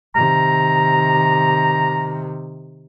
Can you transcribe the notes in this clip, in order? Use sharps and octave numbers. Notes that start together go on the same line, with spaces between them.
C3 D#3 A#5